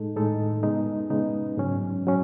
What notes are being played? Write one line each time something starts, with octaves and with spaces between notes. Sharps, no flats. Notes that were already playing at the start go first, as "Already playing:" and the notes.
Already playing: A2 G#3 D#4 A4
A2 G#3 D#4 A4
C#3 G#3 B3 D#4
C#3 G#3 B3 D#4
G#2 F#3 C#4
F#3 C#4